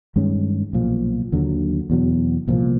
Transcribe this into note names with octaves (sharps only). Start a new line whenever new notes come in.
G2 D#3 G#3 C#4
B1 A#2 F3
D#2 D3 F#3
E2 B2 F#3
C2 A#2 F3